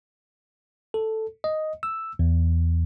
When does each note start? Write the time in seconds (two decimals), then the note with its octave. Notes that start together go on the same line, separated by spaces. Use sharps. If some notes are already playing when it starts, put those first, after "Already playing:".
0.94 A4
1.44 D#5
1.83 E6
2.19 E2